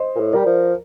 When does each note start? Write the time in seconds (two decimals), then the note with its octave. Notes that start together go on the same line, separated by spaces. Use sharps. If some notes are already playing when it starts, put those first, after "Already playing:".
Already playing: C5 D#5
0.16 A#2
0.20 A2
0.33 G3 A#4 D5
0.46 F3